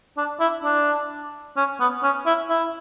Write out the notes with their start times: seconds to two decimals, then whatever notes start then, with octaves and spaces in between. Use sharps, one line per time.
0.17 D4
0.40 E4
0.64 D4
1.57 C#4
1.80 B3
2.03 C#4
2.26 E4
2.50 E4